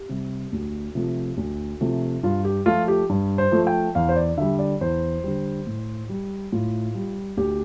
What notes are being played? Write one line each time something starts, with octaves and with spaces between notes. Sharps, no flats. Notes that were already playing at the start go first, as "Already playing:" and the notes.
Already playing: G4
C3 G3
D2
C3 F3 A3
D2
C3 F3 A3
G2 F4
G4
F3 A3 F4
G4
G2
C5
F3 A3
G5
E2 F5
C5
D5
D3 G3 E5
D5
E2 C5
D3 G3
A2
G3
A2 F4
G3
D2 G4